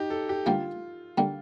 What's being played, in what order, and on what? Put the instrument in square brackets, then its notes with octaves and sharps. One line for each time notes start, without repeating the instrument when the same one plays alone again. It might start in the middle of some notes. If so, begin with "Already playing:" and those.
Already playing: [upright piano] D#4 G4
A4
G4
[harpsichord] D3 G3 A#3 [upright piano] F4
[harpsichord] D3 G3 A#3